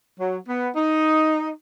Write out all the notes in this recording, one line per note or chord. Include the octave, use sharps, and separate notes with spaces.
F#3
B3
D#4